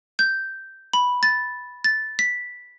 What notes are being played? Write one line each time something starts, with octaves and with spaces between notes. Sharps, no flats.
G6
B5
A6
A6
B6